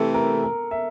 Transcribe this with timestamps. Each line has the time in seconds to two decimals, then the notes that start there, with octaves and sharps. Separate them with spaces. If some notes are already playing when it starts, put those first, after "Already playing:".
Already playing: C3 E3 A3 A4
0.14 A#4
0.43 A#4
0.71 E5